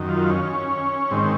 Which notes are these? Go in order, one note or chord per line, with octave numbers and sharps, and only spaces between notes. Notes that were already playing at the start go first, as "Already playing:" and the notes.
Already playing: F#2 D#3
F4
C#4
G#2 D#3 C4